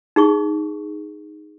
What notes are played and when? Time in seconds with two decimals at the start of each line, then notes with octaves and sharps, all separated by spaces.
0.16 D#4 G#4 C#6